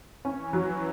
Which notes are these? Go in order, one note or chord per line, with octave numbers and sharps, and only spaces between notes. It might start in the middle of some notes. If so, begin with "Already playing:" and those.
E3 C#4
F#3